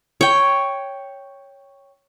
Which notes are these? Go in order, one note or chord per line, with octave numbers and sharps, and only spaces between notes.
C#5 G5